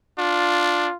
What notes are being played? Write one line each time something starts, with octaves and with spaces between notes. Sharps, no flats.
D4 F4